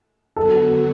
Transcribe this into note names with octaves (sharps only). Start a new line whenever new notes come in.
D3 F#3 B3 F#4 A4